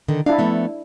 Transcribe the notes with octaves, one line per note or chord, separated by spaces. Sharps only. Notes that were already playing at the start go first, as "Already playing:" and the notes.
D3 D#3
D4 E4 F5
F3 A3 B3